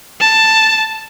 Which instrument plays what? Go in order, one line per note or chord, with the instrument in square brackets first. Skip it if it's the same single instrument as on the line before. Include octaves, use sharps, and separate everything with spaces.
[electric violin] A5